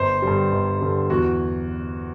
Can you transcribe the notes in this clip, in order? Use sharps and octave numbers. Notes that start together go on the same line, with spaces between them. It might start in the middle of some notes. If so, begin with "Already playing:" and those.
Already playing: G1 C5
G2 D3 G3
G1
G2 D3 G3
E2 F#4